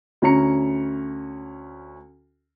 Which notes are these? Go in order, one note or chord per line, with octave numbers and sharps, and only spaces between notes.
D2 C#4 A#5 C#7